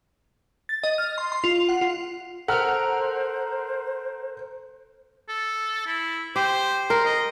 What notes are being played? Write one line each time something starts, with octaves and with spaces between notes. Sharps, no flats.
A6
D#5
F6
C6
C6
F4
F#5
F4
A4 A#4 C5 F#5 A#5 F6
A4
E4
G4 C5
A#4 C6
D#5